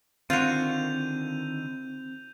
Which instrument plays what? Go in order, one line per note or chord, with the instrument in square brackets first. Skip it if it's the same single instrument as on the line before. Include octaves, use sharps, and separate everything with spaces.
[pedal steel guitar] D3 D#3 [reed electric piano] C4 [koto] F4 F#4 [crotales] G6 D#7 F7